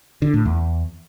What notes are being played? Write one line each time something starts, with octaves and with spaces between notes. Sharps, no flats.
D3
A2
E2